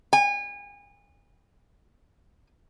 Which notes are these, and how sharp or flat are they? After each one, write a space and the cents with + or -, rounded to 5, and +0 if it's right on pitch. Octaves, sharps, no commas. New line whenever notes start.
G#5 -35